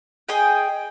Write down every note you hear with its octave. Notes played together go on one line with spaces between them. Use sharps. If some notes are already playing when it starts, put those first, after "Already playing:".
G#4 D#5 G5